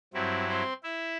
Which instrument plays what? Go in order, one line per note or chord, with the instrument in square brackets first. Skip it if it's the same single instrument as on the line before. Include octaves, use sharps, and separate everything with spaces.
[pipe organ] G2 F#3 C4 E4
C4 C5
E4 E5